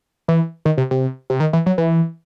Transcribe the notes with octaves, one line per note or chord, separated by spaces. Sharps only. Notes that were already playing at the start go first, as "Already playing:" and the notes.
E3
D#3
C3
C3
C3
D#3
E3
F#3
E3